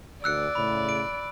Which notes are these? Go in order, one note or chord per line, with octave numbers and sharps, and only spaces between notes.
D2 D5 E6 F#6 C#7
A2 C#3 B5
D7